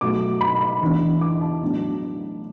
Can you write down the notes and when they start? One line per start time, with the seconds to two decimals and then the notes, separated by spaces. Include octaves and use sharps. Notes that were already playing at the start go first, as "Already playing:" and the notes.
0.01 B2 F#3 A3 D6
0.41 B5
0.61 B5
0.81 E2 E3 B3 D4
1.21 D6
1.41 A5
1.62 A2 F#3 B3 D4